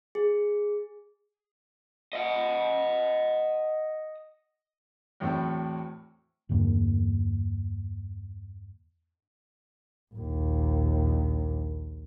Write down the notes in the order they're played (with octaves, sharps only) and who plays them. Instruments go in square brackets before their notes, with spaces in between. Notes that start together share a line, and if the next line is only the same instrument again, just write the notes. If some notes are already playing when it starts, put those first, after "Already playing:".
[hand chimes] G#4
[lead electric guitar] D#5 F#5
[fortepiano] E2 A2 F#3 A3 C4
[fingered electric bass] E2 G2 D3 A#3
[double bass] A#1 D#2